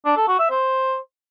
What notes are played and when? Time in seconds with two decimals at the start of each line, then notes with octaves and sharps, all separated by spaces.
0.05 D4
0.16 A4
0.28 F#4
0.39 E5
0.51 C5